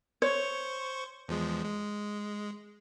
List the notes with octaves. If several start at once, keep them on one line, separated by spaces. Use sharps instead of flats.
C5 C#5 C#6
E2 F3 G#3
G#3